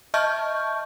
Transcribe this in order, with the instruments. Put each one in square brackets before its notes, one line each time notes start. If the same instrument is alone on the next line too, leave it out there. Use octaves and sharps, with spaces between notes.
[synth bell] D#5 E5 A5 C#6 F6 G6